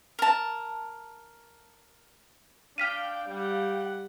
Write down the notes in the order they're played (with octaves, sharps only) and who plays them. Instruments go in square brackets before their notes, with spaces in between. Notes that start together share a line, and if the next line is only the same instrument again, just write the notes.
[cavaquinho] A#4 A5
[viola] D4 [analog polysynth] F5 G5 [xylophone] F6 B6 D#7
[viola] G3 F#5